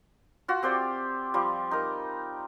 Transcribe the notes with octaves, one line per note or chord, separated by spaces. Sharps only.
F4 F#4
C4 G4 C5 D5
F3 G3
D#4 A#4